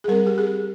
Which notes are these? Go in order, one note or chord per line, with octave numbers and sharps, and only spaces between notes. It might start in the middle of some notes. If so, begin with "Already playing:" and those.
G#4
G3 C4 A#4
G4
G#4